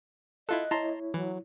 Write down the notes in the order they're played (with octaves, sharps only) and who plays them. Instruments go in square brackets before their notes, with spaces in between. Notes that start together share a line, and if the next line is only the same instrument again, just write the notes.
[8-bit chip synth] E4 F4 A4 [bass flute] D#5 [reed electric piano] F#6
[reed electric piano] E4 C#5 [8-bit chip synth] A5 A#5 C6
[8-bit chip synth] E3 [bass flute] F#3